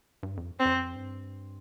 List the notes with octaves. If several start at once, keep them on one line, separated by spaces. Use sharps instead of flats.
G2
F2
C4
F2
G2